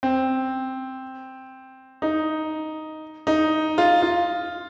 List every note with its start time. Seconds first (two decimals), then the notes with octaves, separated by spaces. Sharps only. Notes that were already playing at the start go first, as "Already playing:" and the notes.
0.03 C4
2.02 D#4
3.27 D#4
3.78 F4
4.02 F4